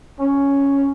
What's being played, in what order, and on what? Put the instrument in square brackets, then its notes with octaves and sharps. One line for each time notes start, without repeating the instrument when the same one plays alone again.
[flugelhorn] C#4